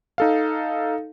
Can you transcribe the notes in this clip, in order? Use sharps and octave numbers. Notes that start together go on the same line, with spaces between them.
D#4 A4 F5